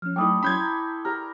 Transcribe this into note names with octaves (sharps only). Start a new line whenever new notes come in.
F3 C#4 F6
F#3 A3 D#4 E4 A4 D5 G5 D#6
F#3 C#4 B5 C6 G6 G#6
A#5
G4 A#4 A#5